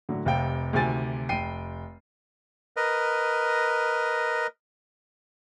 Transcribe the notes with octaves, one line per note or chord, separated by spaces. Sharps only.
A2 D3 F#3
F1 C3 F5 G5
D2 C3 D#3 G4 G#5 A6
F1 G5 C7 D#7
A#4 B4 D#5